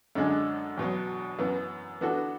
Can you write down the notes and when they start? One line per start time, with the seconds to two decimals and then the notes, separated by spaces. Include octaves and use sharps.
0.15 F#2 D3 G#3 D4 G#4
0.78 E2 B2 F#3
1.39 F#2 E3 B3
2.01 E3 B3 D4 F#4 A4